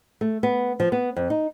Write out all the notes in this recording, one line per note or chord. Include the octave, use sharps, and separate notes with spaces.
A3
B3
F3
B3
F2
D#4